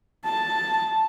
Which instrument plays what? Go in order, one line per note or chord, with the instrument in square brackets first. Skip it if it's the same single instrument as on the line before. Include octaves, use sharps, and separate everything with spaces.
[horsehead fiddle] A5